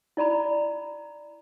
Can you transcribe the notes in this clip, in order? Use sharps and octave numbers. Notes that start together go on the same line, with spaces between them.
E4 D5 A#5 B5